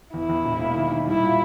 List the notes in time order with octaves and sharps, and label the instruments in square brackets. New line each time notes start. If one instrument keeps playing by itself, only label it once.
[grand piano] E2 [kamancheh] E4
[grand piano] E2
E1
A#3
D#3
D#3
[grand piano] G3 [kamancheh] E4
[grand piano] A#2